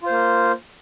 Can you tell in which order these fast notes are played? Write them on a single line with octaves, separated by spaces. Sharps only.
F4 C5 A#3